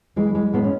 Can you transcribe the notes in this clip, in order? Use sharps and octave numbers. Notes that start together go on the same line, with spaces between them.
E3 G#3
E3 G#3
A2 G#3 B3
C#4